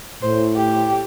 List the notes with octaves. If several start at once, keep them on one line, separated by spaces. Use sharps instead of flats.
A2 C5
G4